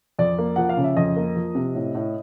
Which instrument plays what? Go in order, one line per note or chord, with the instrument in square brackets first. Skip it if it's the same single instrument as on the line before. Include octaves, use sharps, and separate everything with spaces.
[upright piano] F2 D5
A#3
F3 F#5
F5
C#3
E5
F2 D#5
A#3
F3
C3
A2
A2